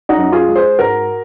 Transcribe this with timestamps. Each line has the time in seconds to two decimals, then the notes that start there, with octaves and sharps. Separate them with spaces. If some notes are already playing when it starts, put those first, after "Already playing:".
0.09 D#4 F#4
0.17 F#2
0.32 F4 G#4
0.48 G#3
0.56 G#4 C5
0.79 G#2 F#4 A#4